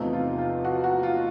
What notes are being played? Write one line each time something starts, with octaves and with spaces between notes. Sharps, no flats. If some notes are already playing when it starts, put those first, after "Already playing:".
Already playing: E2 C3 F3 A3 D#4
F4
F4
F#4
F#4
F4